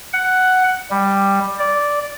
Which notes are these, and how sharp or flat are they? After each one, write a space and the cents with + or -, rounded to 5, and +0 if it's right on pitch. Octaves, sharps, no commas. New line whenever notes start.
F#5 +5
G3 +10
D5 -10